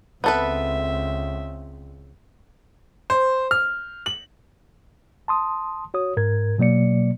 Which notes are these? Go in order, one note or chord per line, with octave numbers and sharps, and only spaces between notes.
C#2 B3 C4 A4 B4 E5
C5
F6
F#7
A5 C6 D#6
F#4 C#5 D#6
G#2 A#4 G#6
B2 F#3 A#3 D5 C#7